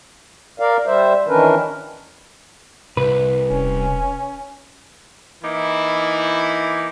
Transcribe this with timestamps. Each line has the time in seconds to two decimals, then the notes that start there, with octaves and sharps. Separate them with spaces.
0.60 A#4 D5 F5
0.86 G3 C5 E5
1.27 D#3 E3 C#4 D4 A#4 B4
2.97 C2 B4
3.51 D#1 C#4
5.42 E3 A#3 D#4 E4